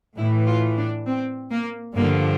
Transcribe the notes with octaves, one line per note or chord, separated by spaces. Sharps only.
A2 E3 E4
F4
D4
C4
A#3
G2 D3 F3 A#3